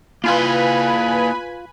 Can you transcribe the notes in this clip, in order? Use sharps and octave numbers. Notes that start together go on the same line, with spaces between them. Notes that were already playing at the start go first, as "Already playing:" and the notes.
A#3 E4 F4 B4 F5 G#5 B5